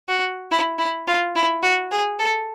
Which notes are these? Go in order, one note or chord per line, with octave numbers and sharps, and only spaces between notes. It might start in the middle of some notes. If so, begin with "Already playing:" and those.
F#4
E4
E4
F4
E4
F#4
G#4
A4